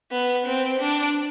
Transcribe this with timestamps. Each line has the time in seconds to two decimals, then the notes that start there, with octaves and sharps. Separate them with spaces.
0.11 B3
0.46 C4
0.80 D4